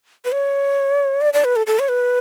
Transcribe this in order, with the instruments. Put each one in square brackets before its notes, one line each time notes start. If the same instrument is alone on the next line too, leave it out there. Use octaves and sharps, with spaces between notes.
[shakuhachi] B4
C#5
D5
D5
B4
A4
A4
C#5
B4